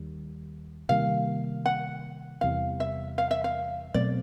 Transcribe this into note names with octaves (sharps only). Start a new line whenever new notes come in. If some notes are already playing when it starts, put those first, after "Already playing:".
Already playing: D#2 D#3 G3
C3 D#3 G3 A#3 F5
F#5
E2 C3 E3 G3 F5
E5
F5
E5
F5
B2 F#3 A3 C4 D5